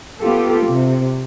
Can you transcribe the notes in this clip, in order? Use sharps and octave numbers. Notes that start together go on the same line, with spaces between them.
B3 F4 G4 A4
C3